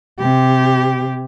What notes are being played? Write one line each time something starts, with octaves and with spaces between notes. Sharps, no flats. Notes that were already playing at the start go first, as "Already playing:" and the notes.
C3 G4